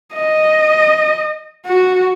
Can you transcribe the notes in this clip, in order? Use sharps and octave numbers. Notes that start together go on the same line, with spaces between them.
D#5
F#4